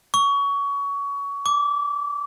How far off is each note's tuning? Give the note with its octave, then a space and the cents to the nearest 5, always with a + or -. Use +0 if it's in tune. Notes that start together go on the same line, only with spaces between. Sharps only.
C#6 +25
D6 -20